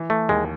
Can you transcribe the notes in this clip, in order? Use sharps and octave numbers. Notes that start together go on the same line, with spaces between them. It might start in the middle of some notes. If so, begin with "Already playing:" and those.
Already playing: E3
A3
D#2 G#3